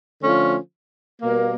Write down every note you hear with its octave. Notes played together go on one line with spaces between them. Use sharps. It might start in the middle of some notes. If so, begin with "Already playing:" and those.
D3 F3 A3 C#4 F4
B2 G3 A#3